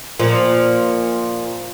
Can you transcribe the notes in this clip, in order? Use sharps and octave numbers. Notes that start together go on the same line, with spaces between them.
A#2 F3